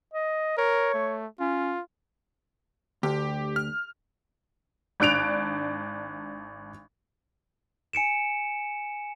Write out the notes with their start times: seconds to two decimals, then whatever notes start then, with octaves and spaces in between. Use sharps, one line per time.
0.14 D#5
0.58 A#4 C#5
0.94 A3
1.40 C#4 F4
3.03 D2 G4
3.56 F6
5.00 G#1 D4 F#6 D7 F7
7.93 G#5 C#7 D7 E7